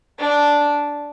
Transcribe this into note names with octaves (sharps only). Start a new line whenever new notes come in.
D4